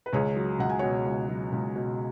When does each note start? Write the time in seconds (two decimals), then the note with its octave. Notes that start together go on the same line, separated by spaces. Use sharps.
0.06 B4
0.13 C#2 G#4 C#5
0.36 F#3
0.59 C#2 F#5
0.69 G#5
0.79 B2 C#5 F#5
1.07 C#2
1.29 F#3
1.52 C#2
1.76 B2